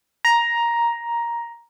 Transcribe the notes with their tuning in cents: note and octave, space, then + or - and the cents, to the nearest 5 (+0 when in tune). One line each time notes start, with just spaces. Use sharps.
A#5 +10